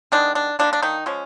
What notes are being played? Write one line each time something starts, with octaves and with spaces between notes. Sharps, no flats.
D#3 G#3 B3 D4
D4
D3 G3 A#3 D4
D4
D#3 D#4
F3 G#3 C#4